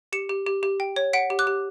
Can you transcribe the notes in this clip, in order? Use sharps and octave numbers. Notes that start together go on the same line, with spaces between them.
G4 C#7 E7
G4
G4
G4
G5
C#5
F#5 B6 D7
G4
D6 F#6
G4